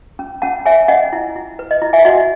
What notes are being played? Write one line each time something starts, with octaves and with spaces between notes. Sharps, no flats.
C#4
C#4 F#5 A5
C#5 E5 G#5
C#4 D#5 F#5
E4
E4
B4
D#5
E4
E5 G#5
F#4 D#5 F#5